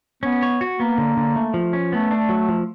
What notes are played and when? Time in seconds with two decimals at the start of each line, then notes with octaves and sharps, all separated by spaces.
0.23 B3 C#4
0.42 C#5
0.61 F#4
0.79 A#3 B3
0.98 D3
1.17 D3
1.36 A3
1.54 F3
1.73 C#4
1.92 A3 B3
2.11 D4
2.29 F#3
2.48 F3